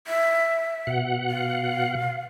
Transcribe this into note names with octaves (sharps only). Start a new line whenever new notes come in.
E5
B2 F#5
F5